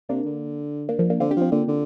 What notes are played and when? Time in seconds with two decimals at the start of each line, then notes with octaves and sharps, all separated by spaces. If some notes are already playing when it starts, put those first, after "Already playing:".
0.09 C3 A#3 D4
0.25 D3
0.89 A#3 D4
0.99 F3 A#3
1.10 A#3 D4
1.20 D3 C4 F4
1.31 D4 G4
1.36 F3
1.42 C4 F4
1.52 D3 A#3 D4
1.68 D3